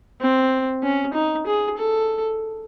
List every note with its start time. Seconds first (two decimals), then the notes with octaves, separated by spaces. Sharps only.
0.21 C4
0.83 C#4
1.14 D#4
1.46 G#4
1.77 A4